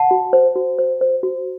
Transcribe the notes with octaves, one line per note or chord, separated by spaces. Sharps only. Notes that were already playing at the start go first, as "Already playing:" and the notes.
Already playing: F#5 A5
F#4
C5
F#4
C5
C5
F#4